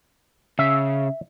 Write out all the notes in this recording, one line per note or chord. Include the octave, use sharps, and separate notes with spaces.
C#3 E5